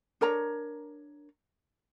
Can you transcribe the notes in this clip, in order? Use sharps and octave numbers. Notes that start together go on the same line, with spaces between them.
D4 A#4 C#5 A#5